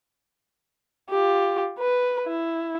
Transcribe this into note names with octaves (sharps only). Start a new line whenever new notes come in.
F4 G4
B4
E4